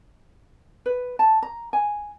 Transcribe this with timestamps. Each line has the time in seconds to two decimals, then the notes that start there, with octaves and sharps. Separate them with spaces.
0.86 B4
1.19 A5
1.42 A#5
1.73 G#5